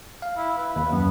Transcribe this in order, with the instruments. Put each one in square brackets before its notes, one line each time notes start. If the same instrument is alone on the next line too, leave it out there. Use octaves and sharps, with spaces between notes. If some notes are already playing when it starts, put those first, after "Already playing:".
[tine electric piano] F5
[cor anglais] E4
B4
[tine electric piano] D#2
[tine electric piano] F#2 [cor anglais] B3